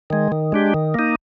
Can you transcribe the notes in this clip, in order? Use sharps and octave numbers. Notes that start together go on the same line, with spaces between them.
D#3 G#3
D#3
G#3 D4 G4
D#3
A#3 D#4